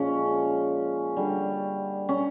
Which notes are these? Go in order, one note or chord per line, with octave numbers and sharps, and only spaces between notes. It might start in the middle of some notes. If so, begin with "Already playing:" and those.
Already playing: A#2 F3 G#3 C#4
D3 G3
C#4